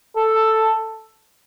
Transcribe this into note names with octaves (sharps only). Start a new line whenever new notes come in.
A4